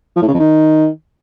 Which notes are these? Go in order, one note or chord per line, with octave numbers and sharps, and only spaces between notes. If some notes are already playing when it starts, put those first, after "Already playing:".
F3
A2
C#3
F2
D#3